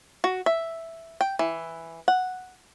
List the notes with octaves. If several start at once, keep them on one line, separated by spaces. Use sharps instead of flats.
F#4
E5
G5
E3
F#5